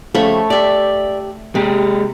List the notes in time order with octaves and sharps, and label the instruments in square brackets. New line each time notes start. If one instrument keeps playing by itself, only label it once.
[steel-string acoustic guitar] C#3 F3 G3 [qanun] A3 C#5 B5
[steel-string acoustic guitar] G4 E5 [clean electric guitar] D5
[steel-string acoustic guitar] C3 [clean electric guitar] G#3 G4